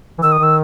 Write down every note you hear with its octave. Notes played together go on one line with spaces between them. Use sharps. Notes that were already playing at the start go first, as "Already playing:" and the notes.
E3
D#3 E6
D#6
D#3 E6